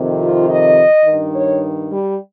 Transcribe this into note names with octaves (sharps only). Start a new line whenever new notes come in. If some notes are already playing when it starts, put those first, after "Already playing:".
Already playing: F2 C3 D#3
F4
D#5
G2 D#3
C#5
G3